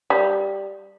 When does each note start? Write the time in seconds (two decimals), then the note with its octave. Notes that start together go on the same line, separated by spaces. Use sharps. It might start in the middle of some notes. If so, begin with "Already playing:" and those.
0.10 G3